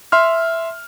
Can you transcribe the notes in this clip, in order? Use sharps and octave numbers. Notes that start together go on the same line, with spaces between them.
E5 C6 F6